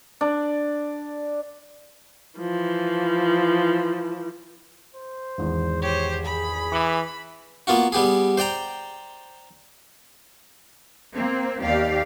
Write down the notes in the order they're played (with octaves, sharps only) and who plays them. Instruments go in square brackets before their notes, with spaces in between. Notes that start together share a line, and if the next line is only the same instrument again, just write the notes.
[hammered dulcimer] D4
[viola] E3 F3
[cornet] C5
[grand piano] G#1 E2
[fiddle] G4 C5 [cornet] C#5
[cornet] G#4 [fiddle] B5
[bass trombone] E3 [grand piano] D6 C#7 F#7
[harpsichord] A#3 B3 F4 F#4
G3 B3 G4 G#4
C5 D5 G5 A#5
[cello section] A#3 C4
D#2 G4 D5 F5